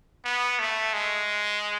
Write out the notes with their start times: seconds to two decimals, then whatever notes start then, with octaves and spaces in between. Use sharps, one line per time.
0.25 B3
0.59 A3
0.93 G#3